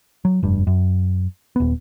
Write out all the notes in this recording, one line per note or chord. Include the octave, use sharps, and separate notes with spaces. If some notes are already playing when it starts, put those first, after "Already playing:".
F#3
F1 G2
F#2
D#1 B3